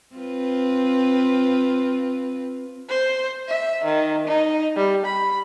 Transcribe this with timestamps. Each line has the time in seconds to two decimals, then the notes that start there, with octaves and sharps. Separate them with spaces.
0.16 C4 F4 B4
2.89 C5
3.49 E5
3.84 D#3
4.27 D#4
4.77 G3
5.06 B5